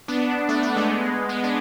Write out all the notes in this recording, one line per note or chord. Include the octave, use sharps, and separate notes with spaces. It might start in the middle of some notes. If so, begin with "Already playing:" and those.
B3 D4
A3
A3
G#3 B3
G#3 B3
D4